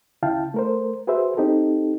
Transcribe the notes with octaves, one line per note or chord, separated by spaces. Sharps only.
D2 C#3 E4 F5 G5 A5
A3 A#4 C5
F#4 G#4 B4 C5 E5
C4 D#4 G4 A4